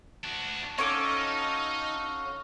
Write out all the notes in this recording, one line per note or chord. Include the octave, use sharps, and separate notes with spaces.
D4 F#4
C#4 D#4 F#4 A4 F5 D6